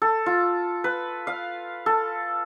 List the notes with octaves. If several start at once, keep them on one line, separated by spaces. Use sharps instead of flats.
A4
F4
B4
F5
A4